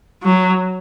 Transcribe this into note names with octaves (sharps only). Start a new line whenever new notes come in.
F#3